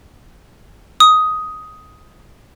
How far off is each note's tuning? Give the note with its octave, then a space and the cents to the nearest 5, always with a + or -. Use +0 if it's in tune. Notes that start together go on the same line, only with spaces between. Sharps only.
D#6 +10